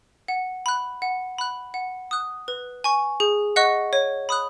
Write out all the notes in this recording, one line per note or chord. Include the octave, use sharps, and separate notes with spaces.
F#5
B5 F#6
F#5
B5 F#6
F#5
D#6 F#6
B4
G#5 C#6
G#4
D#5 F#5 C#6 F#6
C#5
B5 D#6 F#6